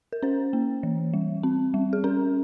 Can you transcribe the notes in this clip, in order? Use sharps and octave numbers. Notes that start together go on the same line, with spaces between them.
A#4
C#4 C5
A#3
E3
G3
C4
G3
G#4
C#4 A#4